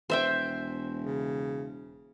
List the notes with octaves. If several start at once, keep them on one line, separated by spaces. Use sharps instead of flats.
E1 C5 E5 G5
C#3